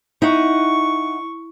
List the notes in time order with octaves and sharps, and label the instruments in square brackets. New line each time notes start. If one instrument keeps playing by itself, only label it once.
[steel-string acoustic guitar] D#4 F#5 [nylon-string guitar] E4 [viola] C#6